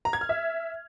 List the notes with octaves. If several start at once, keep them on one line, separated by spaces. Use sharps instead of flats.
A#5
G#6
F6
E5